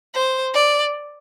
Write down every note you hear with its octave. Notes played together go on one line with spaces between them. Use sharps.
C5
D5